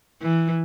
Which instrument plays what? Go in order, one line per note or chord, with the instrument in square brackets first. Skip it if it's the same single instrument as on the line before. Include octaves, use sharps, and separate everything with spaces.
[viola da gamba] E3